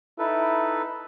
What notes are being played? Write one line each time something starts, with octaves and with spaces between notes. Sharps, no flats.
D#4 E4 A4 B4